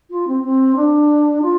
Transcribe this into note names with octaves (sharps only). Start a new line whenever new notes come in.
F4
C4
C4
D4
F4